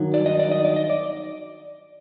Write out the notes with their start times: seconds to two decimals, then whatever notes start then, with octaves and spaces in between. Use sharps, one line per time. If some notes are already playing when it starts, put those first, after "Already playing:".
Already playing: G2 D#3 F#3
0.14 D5
0.26 D#5
0.39 D5
0.51 D#5
0.65 D5
0.76 D#5
0.90 D5